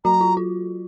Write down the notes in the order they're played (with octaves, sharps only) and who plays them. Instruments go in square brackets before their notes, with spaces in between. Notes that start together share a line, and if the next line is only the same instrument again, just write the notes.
[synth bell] F#3 F#4 [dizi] A#5
[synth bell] F4
F4